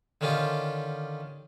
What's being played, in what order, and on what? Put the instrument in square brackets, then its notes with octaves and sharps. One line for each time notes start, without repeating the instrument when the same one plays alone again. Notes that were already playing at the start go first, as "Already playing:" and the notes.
[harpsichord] D3 D#3 C#4 F4 G4